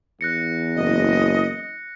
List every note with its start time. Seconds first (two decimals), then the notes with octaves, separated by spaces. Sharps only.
0.21 E2 F#6 A#6 C#7
0.76 F#1 D#5